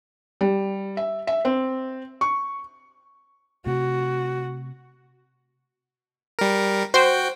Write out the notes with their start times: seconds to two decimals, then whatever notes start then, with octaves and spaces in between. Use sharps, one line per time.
0.41 G3
0.97 E5
1.27 E5
1.45 C4
2.21 C#6
3.66 C3 A3 F#4
6.39 G3 A#4
6.94 F#4 C5 G5